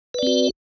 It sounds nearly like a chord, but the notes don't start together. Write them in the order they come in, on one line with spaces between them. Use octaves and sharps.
B4 D5 C4 F#4